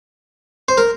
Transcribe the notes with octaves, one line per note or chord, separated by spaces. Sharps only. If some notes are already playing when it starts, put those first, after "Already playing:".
C5
A#4